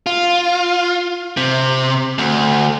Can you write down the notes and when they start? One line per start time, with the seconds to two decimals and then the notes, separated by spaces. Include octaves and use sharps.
0.06 F4
1.37 C3
2.18 D2